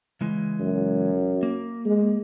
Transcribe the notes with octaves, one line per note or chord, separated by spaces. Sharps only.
C#3 E3 G#3
F#2
A#3
G#3